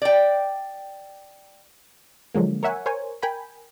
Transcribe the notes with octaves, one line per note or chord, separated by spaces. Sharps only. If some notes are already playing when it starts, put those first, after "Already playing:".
D5 G5
D3 F3 F#3 G#3 A#3
A#4 C#5 E5 F#5 G#5
A#4 C5 C#5 G#5
A#4 G5 G#5 B5